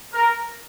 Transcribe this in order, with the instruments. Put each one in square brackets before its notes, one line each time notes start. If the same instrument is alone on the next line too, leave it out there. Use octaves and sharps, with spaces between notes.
[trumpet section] A#4